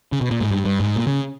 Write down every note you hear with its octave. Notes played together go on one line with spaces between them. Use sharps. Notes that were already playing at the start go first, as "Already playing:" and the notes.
C#3
B2
A#2
G#2
G2
G2
G#2
A#2
C#3